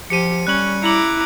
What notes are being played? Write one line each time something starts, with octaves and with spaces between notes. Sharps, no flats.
F3 G4 C#7 D#7
G3 C#4 F#6 F#7
E4 A#5 D6 C#7 F#7